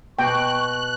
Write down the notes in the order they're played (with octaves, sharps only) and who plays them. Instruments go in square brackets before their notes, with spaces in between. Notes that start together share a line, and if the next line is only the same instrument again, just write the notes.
[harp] B2 [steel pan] G5 [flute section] C#6 [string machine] F#6